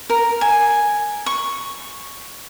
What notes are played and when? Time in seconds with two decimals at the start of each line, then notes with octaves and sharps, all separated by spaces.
0.10 A#4
0.41 G#5
1.26 C#6